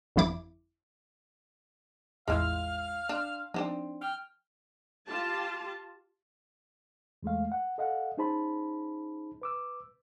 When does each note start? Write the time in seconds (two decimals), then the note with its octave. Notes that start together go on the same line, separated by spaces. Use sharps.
0.16 G1 F2 F3 E4 D6
2.28 A1 E2 G#3 E4 F4 F5 E6 F6
3.09 D4 C6 E7
3.54 F3 C4 D4 D#4
4.01 G5 F6
5.07 F4 G4 A5
7.23 E2 G#3 A3 F5
7.52 F#5
7.78 A4 D#5 F5 F#5
8.17 C#4 D#4 G#4 C5 A5 B5
9.42 B4 D6 E6